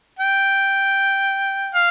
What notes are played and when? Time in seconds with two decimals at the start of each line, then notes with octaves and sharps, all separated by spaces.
0.19 G5
1.75 F5